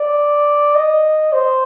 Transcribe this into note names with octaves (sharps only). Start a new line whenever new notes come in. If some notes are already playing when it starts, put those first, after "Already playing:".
Already playing: D5
D#5
C5